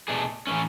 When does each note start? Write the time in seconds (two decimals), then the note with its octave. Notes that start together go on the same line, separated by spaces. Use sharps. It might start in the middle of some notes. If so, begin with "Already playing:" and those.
0.08 B2 A3 D4 G#4
0.47 A2 E3 A3 C#4